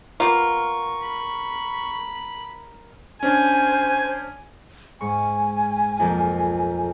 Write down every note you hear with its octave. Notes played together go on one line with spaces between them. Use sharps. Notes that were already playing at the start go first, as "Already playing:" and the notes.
A#3 B3 F4 A#4 C#6
B5
C#4 D4 C5 G#5
G#2 G#5 C#6
B1 F2 A#3